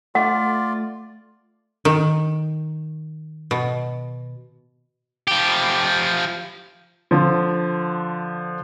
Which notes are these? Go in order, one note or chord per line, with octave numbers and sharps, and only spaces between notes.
A3 F4 D5 F#5
D#3
B2
F3 G4
D3 F3